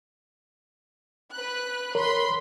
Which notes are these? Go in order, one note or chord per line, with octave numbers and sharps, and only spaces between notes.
B4 F#6
A#4 C#5 B5 C6